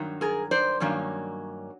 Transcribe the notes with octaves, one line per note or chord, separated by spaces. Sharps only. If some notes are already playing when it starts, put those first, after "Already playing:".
Already playing: G2 D#3 F#3
G#4 A#4
C5 D5
G2 D#3 F#3 A#3 C#4